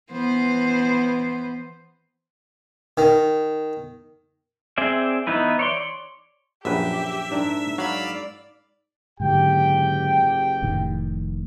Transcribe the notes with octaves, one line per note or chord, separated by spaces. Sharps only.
E3 B3 C5
D#3
C4 G#4 D5 E5
E3 B3 D#4 E4 B4
C#5 D5 C6
A#1 F#2 G4 B4 E5
G#2 D4 A#4
F#3 D5 F5 B5 E6
F#1 G#2 D3 F#3 G4 G5
F1 A2 D#3